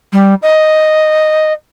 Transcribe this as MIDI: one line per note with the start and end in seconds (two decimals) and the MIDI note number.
0.13 0.34 55
0.42 1.53 75